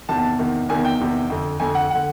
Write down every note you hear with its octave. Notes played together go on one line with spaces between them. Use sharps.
E2 C3 D#3 A5
A5
E2 C3 D#3
E2 C3 D#3 G#5
G5
E2 C3 D#3
F2 D3
F2 D3 G#5
F#5
D3 F#5